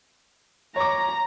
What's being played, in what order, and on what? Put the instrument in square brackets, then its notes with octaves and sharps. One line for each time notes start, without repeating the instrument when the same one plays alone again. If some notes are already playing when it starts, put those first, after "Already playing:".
[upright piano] C#5 D6 [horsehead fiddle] A#5